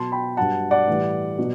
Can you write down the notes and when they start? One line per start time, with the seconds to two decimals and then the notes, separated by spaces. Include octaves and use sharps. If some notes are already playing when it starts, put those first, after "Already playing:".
Already playing: B2 F#3 A5 C6
0.12 G5 B5
0.37 G2 F#3 F#5 A5
0.71 D5 F#5
0.88 A2 E3 G3
1.38 B2 F#3